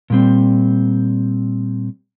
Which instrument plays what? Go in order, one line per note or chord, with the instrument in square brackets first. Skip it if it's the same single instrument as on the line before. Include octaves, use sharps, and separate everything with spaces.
[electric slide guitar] A#2 G3 C4